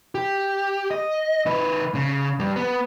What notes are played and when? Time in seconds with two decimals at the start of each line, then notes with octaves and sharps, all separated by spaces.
0.15 G4
0.91 D#5
1.46 D#3 B4
1.95 C#3
2.39 G2 G3
2.56 B3